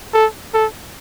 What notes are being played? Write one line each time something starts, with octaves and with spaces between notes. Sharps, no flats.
A4
A4